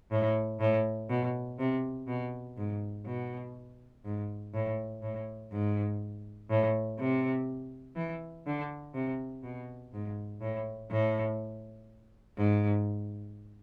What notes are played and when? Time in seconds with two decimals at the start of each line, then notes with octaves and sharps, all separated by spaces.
0.11 A2
0.60 A2
1.10 B2
1.59 C3
2.07 B2
2.57 G#2
3.06 B2
4.05 G#2
4.54 A2
5.03 A2
5.52 G#2
6.50 A2
6.99 C3
7.96 E3
8.46 D3
8.94 C3
9.43 B2
9.93 G#2
10.41 A2
10.90 A2
12.37 G#2